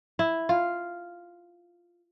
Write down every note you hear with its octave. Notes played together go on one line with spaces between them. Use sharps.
E4
F4